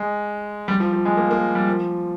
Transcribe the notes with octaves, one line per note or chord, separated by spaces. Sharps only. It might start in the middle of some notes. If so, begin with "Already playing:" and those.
Already playing: G#3
G3
F3
F3
G#3
A#3
A#3
G3
F3